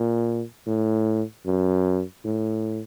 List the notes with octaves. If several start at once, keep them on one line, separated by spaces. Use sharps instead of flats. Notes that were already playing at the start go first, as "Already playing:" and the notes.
Already playing: A#2
A2
F#2
A2